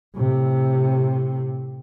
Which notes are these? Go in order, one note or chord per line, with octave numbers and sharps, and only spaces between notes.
A2 C3